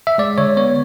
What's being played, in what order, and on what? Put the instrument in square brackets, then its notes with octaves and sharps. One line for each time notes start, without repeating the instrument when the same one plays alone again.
[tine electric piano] E5
G#3 D5
D3 C#5
B3 C#5